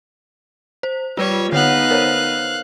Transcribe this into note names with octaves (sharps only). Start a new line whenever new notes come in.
C5
G3 F4 B4 C#5
D3 B3 D#4 C#5 F5 F#5 F#6
A#4 C5 C#5